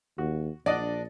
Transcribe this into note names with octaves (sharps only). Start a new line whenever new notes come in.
D#2 F#4
A#1 D4 D5 D#5 F#5